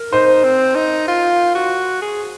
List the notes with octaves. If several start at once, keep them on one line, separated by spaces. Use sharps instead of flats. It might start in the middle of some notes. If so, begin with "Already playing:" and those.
Already playing: A#4
D#4 C5
C4
D#4
F4
F#4
G#4